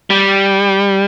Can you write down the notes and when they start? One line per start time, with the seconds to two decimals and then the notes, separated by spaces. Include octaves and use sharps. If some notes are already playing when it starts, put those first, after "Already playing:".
0.10 G3